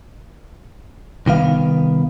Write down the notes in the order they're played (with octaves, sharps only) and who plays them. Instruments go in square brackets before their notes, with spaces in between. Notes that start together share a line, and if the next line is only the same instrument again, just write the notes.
[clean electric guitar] C2 D#3 B3 F5